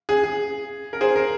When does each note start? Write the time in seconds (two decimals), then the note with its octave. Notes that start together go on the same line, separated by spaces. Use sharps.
0.09 G#4
0.24 G#4
0.93 A#4
1.01 G#4 C5
1.16 A#4